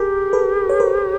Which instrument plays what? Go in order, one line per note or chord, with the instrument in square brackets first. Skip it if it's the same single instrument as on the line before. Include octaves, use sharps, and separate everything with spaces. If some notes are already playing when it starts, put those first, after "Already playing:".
Already playing: [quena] G4 [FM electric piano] G#4 A#4
[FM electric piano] A4 B4
C#5
A#4 C5